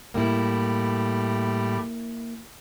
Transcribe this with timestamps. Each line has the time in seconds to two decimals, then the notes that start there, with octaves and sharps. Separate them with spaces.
0.14 A2 G3 A#3 E4